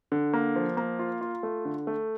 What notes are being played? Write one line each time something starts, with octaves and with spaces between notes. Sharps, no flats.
D3
A#3
F3
A#3
F4
F4
A3
D3
A3